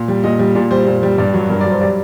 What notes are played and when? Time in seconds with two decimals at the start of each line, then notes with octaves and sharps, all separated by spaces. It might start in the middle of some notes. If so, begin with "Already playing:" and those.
Already playing: A#2
0.08 G3
0.24 A#2 D#5
0.39 G3
0.55 A#2 D5
0.71 G3 C5
0.87 A#2
1.03 G3
1.18 G2 D5
1.34 F#3
1.50 G2 A#4
1.61 D5
1.65 F#3
1.71 C5
1.81 G3 D5